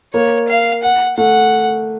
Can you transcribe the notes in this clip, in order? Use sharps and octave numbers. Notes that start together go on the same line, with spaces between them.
A#3 C#5
F5
F#5
A3 F#5